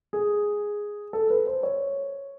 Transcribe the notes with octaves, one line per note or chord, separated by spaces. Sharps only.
G#4
A4
B4
C5
C#5